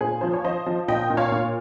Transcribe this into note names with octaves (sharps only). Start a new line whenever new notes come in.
A#2 G#4 C5
F3 C5
C#5
F3 C5 D#5
F3
A#2 D#5 G5
A#2
C#5 F5
A#2